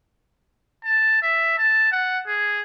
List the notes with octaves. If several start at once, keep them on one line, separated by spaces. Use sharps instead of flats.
A5
E5
A5
F#5
G#4